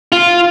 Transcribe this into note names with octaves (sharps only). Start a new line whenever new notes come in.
F4